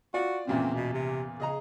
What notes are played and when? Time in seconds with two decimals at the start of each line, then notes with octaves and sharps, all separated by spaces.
0.14 F4 F#4 D5
0.47 E2 A#2 C#3 C4
0.75 B2
0.93 C3
1.40 C#3 G#4 D#5 A#5